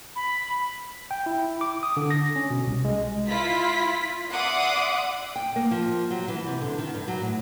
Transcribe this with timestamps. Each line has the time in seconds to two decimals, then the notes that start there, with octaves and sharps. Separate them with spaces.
0.16 B5
1.11 G5
1.26 E4
1.61 D6
1.83 D#6
1.97 D3
2.11 A#6
2.36 C#4
2.50 B2
2.67 C2
2.85 G#3
3.28 E4 F4 B6
4.30 D5 E5 F#5 C6 D6 D#6
5.36 G5
5.56 A#3
5.71 F3
6.10 F#3
6.28 E3
6.47 C3
6.61 D3
6.78 D#3
6.95 G2
7.08 F#3
7.22 A2